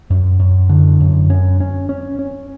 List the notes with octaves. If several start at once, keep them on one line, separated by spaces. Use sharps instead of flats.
F#2
F#2
D3
F#2
C#4
C#4
C#4
C#4